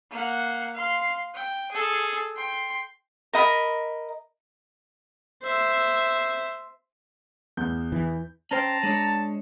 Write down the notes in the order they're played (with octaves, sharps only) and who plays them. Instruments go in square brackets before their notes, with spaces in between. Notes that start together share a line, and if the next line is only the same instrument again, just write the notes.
[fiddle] A#3 F#5
F5 C6
G5
G#4 A4
G5 C6
[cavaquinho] A#4 D#5 B5
[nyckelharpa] C5 E5
[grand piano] E2 G6
[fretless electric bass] E3
[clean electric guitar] C#4 C5 G5 [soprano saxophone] A5 [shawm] A#5
[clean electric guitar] G#3 D4 C#5